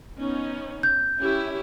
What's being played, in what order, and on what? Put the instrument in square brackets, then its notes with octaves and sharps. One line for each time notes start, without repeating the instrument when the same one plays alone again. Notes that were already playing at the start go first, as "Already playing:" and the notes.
[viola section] B3 C#4 D#4
[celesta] G6
[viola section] C#4 E4 G4